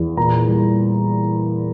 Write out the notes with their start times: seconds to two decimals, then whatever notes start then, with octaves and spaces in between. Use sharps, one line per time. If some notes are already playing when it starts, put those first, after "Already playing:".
Already playing: E2
0.17 A#2 A#5
0.47 G3